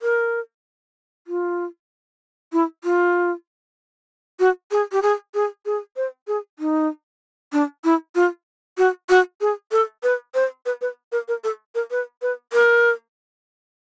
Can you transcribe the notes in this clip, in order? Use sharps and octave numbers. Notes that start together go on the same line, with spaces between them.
A#4
F4
E4
F4
F#4
G#4
G4
G#4
G#4
G#4
C5
G#4
D#4
D4
E4
F4
F#4
F#4
G#4
A4
B4
C5
B4
B4
A#4
A#4
A4
A#4
B4
B4
A#4